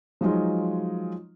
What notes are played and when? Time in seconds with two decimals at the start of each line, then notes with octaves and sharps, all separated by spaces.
0.21 F3 F#3 G#3 D#4 F4